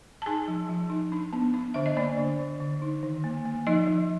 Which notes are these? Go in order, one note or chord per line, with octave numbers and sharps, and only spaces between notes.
A5
D#4 G#4 G#5
F3
F3
D#4
D4
B3
D4
D3 E5
D#5
A#3 D4 D5
D3
D3
D3
D#4
D#3
A#3
A#3
F3 D#4 D#5
F3